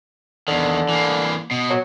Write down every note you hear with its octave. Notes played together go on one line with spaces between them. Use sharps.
E2 D3 D#3
E3 A#3
B2
F#3